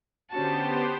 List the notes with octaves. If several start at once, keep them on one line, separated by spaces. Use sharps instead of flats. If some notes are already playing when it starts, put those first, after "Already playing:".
D3 B3 C#4 F#4 G4 C5 A5